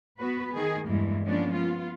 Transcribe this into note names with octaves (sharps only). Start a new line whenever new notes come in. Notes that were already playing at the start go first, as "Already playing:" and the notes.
B3 F#4 B4
D#3 G#4
E2 G2 E3 G#3 A#3
F3 G#3 A#3 B3 C#4 D4
B3 F4